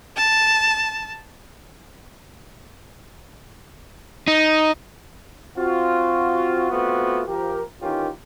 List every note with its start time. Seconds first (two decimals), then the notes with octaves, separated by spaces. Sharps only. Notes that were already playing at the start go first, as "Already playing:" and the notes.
0.16 A5
4.28 D#4
5.57 C4 F4 F#4
6.70 A3 B3 C4 F4 F#4
7.27 F3 G4 A#4
7.81 D#3 E3 C#4 F4 G4 A#4